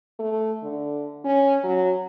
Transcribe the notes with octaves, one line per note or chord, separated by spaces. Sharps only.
A3
D3
C#4
F#3